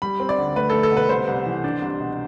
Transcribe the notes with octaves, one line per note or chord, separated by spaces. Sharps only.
G3 B5
C4
D5
D2
A3 B4
A3 A4
A4
B2
B4
C2 C5
C2
E3
D4
C2
B2